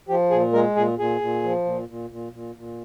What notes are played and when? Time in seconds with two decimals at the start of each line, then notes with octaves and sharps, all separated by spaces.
0.09 F3 G4
0.31 A#2 G#4
0.53 G#3 A#4
0.75 A#2 G#4
0.99 A#2 G#4
1.21 A#2
1.44 F3
1.65 A#2
1.88 A#2
2.10 A#2
2.32 A#2
2.55 A#2